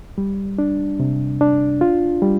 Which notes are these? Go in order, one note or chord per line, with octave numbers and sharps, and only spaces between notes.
G3
D4
C3
D4
F4
G3